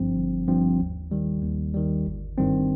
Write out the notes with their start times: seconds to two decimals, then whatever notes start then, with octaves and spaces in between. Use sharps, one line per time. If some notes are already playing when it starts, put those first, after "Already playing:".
Already playing: G1 G2 F3 C4
0.16 G1
0.47 G2 F3 C4
0.79 D#2
1.11 D#3 G3
1.43 D#2
1.74 D#3 G3
2.06 G1
2.38 G2 D#3 G3 C4